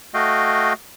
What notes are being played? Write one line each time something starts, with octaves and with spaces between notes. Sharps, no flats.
A3 F#4 D#5 F5 G5